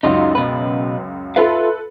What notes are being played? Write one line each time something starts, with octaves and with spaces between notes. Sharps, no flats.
C#2 F#2 D#4 F4 F#4
B2 B4
F4 A4 B4 E5 F5